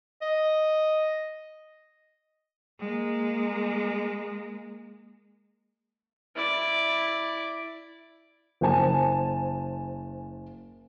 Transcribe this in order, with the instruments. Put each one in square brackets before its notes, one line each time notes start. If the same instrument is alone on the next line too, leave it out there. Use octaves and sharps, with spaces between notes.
[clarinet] D#5
[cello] G#3 A#3
[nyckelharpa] E4 D5
[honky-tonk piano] F#1 C5 G#5 A5